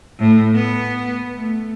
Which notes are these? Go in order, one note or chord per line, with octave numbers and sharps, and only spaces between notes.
A2
B3
A3